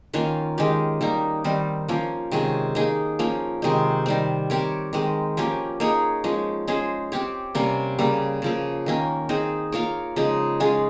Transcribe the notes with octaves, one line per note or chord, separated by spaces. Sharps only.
D#3 A#3 C#4 F4
D#3 G#3 C#4 G4
D#3 G3 A#3 D#4
D#3 G3 C4
F3 A#3 C#4
C3 D#3 G#3 C#4
A#3 D#4 G#4
F3 A#3 C#4
C3 D#3 G#3 D#4
D#3 G3 C4
C4 G4 A#4 C#5
D#3 G#3 C4
F3 A#3 C#4 G4
A#3 D#4 G#4 C#5
F3 G#3 C#4
G#3 C#4 G#4 C5
C4 G4 C#5
C3 G3 A#3 C#4
C#3 G3 A#3
C#3 F3 A#3
D#3 A#3 C#4
C4 D#4 G#4
A#3 F4 A#4 C#5
C#3 F3 G#3 D#4
G#3 C#4 F4 G#4